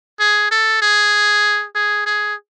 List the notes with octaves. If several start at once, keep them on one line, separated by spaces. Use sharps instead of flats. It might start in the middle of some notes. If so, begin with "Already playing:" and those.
G#4
A4
G#4
G#4
G#4